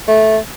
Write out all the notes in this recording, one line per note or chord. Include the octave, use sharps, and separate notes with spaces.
A3